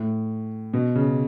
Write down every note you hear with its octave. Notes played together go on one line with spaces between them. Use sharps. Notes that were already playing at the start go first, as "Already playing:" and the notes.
Already playing: A2
B2
C#3